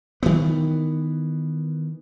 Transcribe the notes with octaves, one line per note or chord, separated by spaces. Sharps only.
D#3 E3 B3